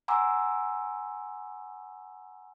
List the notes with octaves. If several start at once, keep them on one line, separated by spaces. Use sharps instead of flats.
F#5 G#5 A#5 C6 D6 E6